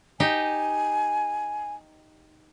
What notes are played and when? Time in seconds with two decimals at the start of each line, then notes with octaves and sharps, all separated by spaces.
0.20 D#4 G4 G#5